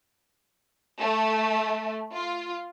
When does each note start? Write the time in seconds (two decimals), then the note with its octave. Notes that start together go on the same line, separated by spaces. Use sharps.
1.01 A3
2.14 F4